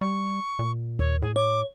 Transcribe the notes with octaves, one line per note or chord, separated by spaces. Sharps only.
G3 C#6
A#2
D#2 C#5
A2 G#4
C#5 D6